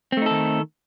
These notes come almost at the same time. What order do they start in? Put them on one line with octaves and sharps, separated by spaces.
C4 A3 D#4 A4 D#3